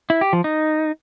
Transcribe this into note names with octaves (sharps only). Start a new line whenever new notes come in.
E4
G4
F3
D#4